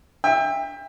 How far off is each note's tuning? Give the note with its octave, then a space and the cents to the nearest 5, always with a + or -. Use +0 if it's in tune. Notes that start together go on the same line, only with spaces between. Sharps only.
E5 +0 G5 +30